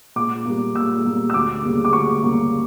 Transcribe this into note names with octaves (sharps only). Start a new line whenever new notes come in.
A#2 D6
G3 A#3
A#2 E6
G3 A#3
E6
D2 D6
C#3 G3 A#3
D6
D2 C#6
C#3 G3 A#3